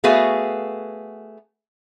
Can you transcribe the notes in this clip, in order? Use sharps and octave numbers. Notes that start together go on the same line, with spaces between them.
A3 B3 F#4 G#4 B4 F5